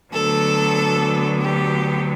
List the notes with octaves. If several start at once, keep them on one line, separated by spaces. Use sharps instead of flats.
D2 D3 F#3 B3 A4
G4